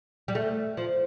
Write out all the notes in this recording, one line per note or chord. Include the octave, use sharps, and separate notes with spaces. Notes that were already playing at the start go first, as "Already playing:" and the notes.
G3
A3
F3